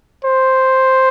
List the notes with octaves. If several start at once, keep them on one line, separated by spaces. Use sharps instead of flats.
C5